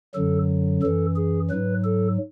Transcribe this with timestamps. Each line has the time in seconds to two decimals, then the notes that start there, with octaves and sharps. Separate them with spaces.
0.15 F#2 D3 F#3 A4
0.82 F#2 E3 A4
1.16 G#4
1.50 G#2 F#3 B4
1.84 A4